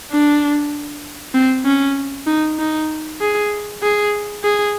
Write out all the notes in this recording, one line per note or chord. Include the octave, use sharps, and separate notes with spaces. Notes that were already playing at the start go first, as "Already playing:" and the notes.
D4
C4
C#4
D#4
D#4
G#4
G#4
G#4